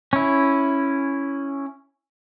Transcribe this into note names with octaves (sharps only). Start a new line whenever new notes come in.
C#4 E4